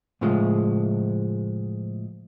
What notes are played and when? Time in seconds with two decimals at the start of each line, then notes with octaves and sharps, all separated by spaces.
0.21 A2 C#3 F3 G#3